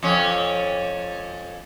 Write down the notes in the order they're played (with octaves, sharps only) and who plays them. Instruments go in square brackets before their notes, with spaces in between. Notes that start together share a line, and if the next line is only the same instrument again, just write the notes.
[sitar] F2 C#4